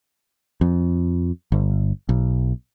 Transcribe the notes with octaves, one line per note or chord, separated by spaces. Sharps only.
F2
G1
B1